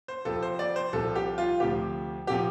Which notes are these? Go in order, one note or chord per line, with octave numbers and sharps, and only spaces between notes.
C5
F2 C3 F3 A4
C5
D5
C5
C2 C3 F3 A4
G4
F4
D2 C3 F3 G4
C3 F3 G4